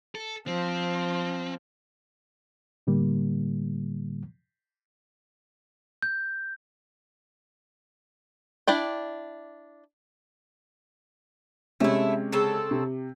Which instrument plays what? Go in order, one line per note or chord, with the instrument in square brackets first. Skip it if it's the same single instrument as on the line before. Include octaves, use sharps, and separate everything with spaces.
[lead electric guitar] A4
[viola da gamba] F3 [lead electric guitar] C4
[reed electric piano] A2 D3 G3 A#3
[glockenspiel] G6
[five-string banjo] D4 E4 D5 G5
[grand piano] C3 G#3 C#4 [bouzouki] A3 E4
[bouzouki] C#3 C4 A4
[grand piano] C3